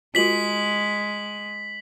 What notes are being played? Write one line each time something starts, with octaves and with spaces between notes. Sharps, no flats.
G#3 F4 F#4 A#4 B6 F#7